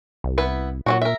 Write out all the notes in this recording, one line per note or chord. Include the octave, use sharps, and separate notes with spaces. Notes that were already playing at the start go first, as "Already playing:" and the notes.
C2
B3 E4 B4
A#2 F#3 G#3 F#4
A#4 E5